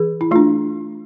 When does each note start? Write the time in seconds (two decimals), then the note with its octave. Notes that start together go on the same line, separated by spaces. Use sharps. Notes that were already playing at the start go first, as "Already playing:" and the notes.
Already playing: E3 G#4
0.21 E4
0.31 A3 D4 F4